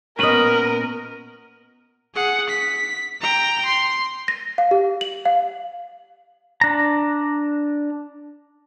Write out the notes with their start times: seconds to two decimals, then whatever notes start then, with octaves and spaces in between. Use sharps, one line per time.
0.19 A#2 B3 C#4 A#4 B4 D#5 B5
2.15 G#4 F#5
2.50 B6
3.21 G5 A#5
3.66 C6
4.28 A#6
4.58 F5
4.71 G4
5.01 F#7
5.25 F5
6.61 D4 A#5